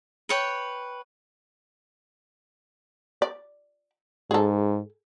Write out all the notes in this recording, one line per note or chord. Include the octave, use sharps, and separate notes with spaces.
B4 C#5 G5
D5
G#2 G#4 A4